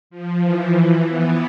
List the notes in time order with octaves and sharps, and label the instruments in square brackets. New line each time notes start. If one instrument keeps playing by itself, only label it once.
[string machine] F3
E3
B3